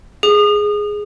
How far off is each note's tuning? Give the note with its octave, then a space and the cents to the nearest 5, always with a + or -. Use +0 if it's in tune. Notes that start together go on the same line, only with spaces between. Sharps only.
G#4 +0 D#6 -30